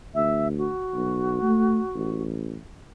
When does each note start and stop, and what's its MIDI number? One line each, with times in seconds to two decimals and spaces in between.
0.15 0.68 38
0.15 0.48 76
0.58 2.23 66
0.94 1.41 35
1.42 1.80 57
1.95 2.57 33